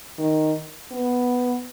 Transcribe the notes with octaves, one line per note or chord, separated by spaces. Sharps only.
D#3
B3